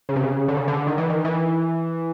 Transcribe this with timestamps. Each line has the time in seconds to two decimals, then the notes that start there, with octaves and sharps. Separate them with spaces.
0.09 C#3
0.16 C3
0.24 C#3
0.48 D3
0.57 C#3
0.68 D3
0.87 D#3
0.98 E3
1.10 D#3
1.25 E3